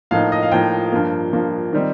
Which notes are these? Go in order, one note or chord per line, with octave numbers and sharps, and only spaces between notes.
A2 F3 A#3 D#4 F5
D#5
F5
A2 F3 A#3 D#4 G5
G2 F3 A#3
G2 F3 A#3
D#3 G3 C4 D#4